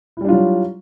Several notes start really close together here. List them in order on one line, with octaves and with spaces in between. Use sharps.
E4 G3 D4 F4 F#3